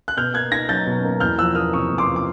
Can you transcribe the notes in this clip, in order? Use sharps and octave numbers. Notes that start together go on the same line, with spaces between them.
F#6
B2 F6 G6
A#3 F#6 G#6
D#4 G#6 A#6
F#3 G6 A6
B2
A#3
E2 F6 G6
F3 E6 F#6
A#3 D#6 F6
C3 C#6 D#6
E2
C6 D6
F3
D6